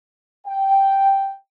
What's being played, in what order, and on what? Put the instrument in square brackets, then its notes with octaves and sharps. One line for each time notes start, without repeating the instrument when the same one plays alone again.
[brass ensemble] G5